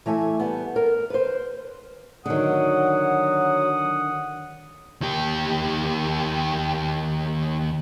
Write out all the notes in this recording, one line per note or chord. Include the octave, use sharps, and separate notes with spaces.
E3 A3 E5 G#5
G3 B3
A#4
B4 C5
D3 D#3 F#3 F#5 D#6
D#2 G4